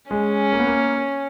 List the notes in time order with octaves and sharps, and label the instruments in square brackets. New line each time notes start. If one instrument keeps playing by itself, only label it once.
[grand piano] G#3 [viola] C#4
[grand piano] A#3
B3
A#3